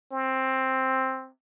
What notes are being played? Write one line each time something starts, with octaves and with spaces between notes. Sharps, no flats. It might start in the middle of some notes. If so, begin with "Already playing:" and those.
C4